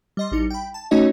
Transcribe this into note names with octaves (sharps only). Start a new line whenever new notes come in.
G3 D#5 C6
A1 G3 D#4 C#7
G5 B5
A5
A3 C#4 D#4 F#4 C#5 D#5